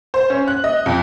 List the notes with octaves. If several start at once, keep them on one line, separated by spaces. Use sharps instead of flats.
C5
C#4
F#6
D#5
F2